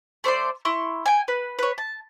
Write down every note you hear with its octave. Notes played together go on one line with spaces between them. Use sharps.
A3 C5 D5 C6
E4 C6 C#6
G5 G#5
B4
B4 C#5
A5